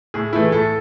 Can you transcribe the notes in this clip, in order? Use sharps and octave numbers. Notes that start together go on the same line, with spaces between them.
A2 G#4
E3 A3 E4
A2 A4